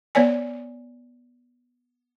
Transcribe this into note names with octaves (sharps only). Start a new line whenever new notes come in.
B3 C#5 D5 G#5